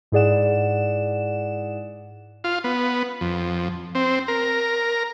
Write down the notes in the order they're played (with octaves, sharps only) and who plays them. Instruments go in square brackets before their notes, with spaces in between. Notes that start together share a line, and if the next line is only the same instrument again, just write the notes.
[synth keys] G#2 E4 G#4 D5 F#5 E7
[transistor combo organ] F4
B3
F2
C4
A#4